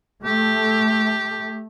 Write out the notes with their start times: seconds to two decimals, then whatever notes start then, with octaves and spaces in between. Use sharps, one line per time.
0.24 A3 G4